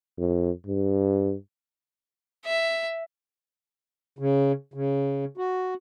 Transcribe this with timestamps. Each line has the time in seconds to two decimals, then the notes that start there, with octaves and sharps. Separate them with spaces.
0.18 F2
0.66 G2
2.45 E5
4.19 C#3
4.74 C#3
5.38 F#4